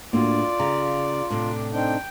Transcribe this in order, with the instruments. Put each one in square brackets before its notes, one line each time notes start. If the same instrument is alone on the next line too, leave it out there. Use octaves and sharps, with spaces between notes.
[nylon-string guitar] A2 [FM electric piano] A#3 D4 F#4 [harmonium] F4 [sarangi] D5
[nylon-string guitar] C#3 [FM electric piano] A#5
[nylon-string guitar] A2 C3 [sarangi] D4
[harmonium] C4 D4 D#4 [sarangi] G5